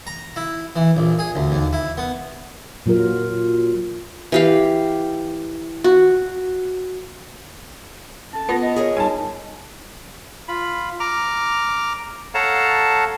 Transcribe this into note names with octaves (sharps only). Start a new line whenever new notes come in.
A#5
E4
E3
A#1
G#4
D2
D#2
E4
B3
A#2 F#3 F4 A#4
E3 G4 F5
F#4
C#4 A4 A5
B3 F4 A#6
D#5
G#4 A#4 C#5
G3 D#4 G#5 A5
F4 B5
A#5 D6 F6
A4 C#5 F5 F#5 A5 A#5